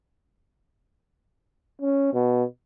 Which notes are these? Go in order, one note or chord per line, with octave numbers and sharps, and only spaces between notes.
C#4
B2